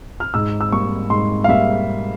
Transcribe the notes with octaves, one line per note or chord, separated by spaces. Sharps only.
F6
G#2 E6
E6
G3 A#3 C#6
G#2 C6
F5
G3 A#3 E5